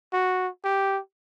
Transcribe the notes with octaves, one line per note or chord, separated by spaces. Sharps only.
F#4
G4